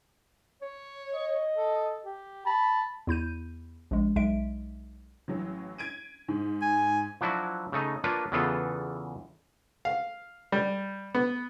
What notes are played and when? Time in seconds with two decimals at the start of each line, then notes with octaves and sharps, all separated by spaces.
0.62 C#5
1.15 D#5
1.55 A4
2.05 G4
2.46 A5 B5
3.07 E2 E4 G6 D#7
3.91 A#1 G#3
4.16 B1 G#3 E5 D7
5.28 A1 E3 F#3
5.78 G#6 D7 D#7
6.28 G#2
6.62 G#5
7.21 F3 F#3 D4 E4 F#4
7.72 C#3 A3 D#4
8.04 A#3 D4 F4 B4 C#5
8.32 E2 C#3 E3 B3 F4 A4
9.85 F5
10.52 G3
11.15 B3